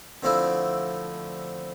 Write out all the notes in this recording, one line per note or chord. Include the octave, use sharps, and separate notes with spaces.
D3 F3 A3 C4 E4